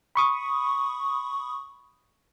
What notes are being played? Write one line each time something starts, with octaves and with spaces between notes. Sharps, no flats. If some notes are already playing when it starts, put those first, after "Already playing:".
B5 C#6 D#6